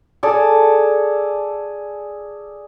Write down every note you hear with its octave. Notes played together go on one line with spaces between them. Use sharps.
G#4 A4 D5